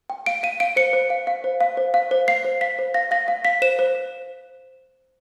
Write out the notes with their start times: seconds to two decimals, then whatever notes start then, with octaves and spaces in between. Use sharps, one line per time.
0.10 G5
0.26 F5 D7
0.43 F5 D#7
0.60 F5 D7
0.76 C5 C#7
0.93 C5
1.10 F5
1.27 F5
1.44 C5
1.61 F5
1.77 C5
1.94 F5
2.11 C5
2.28 F5 C7
2.45 C5
2.61 F5 B6
2.79 C5
2.94 F5 A#6
3.11 F5 A#6
3.28 F5
3.45 F5 B6
3.62 C5 E7
3.79 C5